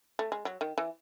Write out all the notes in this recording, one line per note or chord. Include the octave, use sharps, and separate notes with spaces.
A3
G#3
F#3
D#3
E3